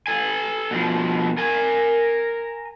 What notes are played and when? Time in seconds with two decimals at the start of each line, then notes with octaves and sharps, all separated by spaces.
0.07 A4 G#5
0.71 B2 F3
1.38 A#4 G#5